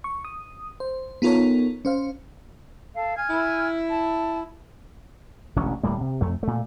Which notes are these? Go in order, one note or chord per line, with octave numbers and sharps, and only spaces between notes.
C#6
D#6
C5
B3 D#4 F4 A4 A#4 C#5
C#4 C5 F5
A4 F5
G#5 F6 G#6
E4
A5
E1 A1 D3 C#4
D1 A2 G3 A#3
C3
F2 A3
A#2 A3